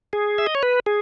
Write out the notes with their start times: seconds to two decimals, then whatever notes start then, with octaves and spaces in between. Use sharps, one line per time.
0.13 G#4
0.38 E5
0.47 D#5
0.55 C#5
0.63 B4
0.86 G#4